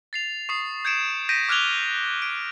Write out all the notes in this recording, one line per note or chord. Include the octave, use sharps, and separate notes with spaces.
A6 C7 F7
C#6 D#6 C7
G6 G#6 C#7 D7 E7
G6 A#6 B6 D7 D#7
D6 F6 F#6 G#6 F7 G7
D7